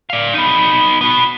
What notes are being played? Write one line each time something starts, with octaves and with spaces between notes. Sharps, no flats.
D5 F5
B3 D#4
B3 F#4